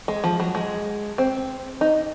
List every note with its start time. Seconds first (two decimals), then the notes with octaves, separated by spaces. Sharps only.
0.08 G#3
0.24 F3
0.40 F#3
0.55 G#3
1.18 C4
1.81 D#4